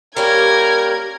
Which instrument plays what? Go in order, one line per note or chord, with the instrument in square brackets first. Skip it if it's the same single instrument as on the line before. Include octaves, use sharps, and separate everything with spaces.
[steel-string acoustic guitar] G3 C#4 G4 [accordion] A#3 [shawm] A#4 [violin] G#6